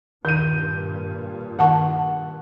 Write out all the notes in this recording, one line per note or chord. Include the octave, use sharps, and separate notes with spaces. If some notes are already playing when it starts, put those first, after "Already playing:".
G2 A#2 D#3 G6 D#7
D#3 F#5 A5 C#6